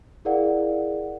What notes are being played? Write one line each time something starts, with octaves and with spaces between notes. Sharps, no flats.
E4 G#4 A#4 D5 F5 F#5